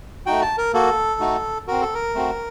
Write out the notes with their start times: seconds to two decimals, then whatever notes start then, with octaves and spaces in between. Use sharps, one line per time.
0.26 A3 D#4 F#4 G5
0.42 A5
0.58 A#4
0.74 A#3 F#4 A4
1.20 A3 D#4 F#4
1.68 C4 F#4 A#4
1.81 A4
1.94 A#4
2.15 A3 C4 F#4